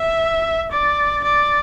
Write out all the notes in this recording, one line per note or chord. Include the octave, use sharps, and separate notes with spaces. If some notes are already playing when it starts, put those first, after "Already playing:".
Already playing: E5
D5
D5